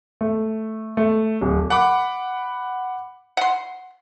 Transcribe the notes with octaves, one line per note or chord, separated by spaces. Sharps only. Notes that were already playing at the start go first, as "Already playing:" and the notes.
A3
A3
D1
F#5 B5 D6
F#5 C6